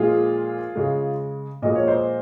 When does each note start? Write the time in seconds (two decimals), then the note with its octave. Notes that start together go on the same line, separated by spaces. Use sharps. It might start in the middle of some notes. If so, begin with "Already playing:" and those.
Already playing: A#2 F3 G#3 F4 G#4
0.75 C#3 G#3
1.62 A#2 F3 G#3 D#5
1.75 C#5
1.87 C5 D#5